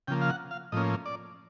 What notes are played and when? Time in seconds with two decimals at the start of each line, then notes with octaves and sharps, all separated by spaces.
0.08 C#3 F3 A#3 G5
0.22 F5
0.30 F#5
0.51 F5
0.72 A2 F3 A#3 C#4 D#5
1.06 D5